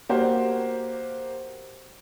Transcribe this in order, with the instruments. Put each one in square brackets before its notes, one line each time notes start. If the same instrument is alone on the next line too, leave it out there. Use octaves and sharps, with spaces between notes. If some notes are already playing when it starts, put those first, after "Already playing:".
[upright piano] A#3 F#4 G4 C5